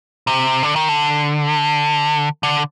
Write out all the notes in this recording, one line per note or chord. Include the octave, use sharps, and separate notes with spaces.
C3
D3
D#3
D3
D3